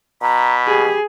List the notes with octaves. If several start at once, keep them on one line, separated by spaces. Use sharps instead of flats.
B2 A#5 B5
G4 G#4